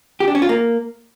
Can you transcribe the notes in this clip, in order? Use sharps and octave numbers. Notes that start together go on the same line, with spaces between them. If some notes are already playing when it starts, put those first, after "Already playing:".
G4
D4
C#4
F4
A#3